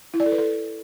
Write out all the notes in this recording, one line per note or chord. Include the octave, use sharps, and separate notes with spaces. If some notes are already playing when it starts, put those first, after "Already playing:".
E4
D5
A4
B4
A4